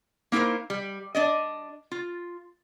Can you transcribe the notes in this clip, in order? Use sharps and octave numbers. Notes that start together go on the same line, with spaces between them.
A#3 D#4 E4 A#4 C5
G3
D4 D5 D#5
F4